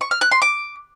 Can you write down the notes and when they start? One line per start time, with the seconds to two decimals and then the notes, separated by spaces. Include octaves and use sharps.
0.01 C#6
0.11 F6
0.21 F#6
0.31 C6
0.42 D6